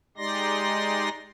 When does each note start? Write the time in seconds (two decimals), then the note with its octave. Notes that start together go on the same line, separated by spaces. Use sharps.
0.18 G#3 D#4 G4 D5 C6 A#6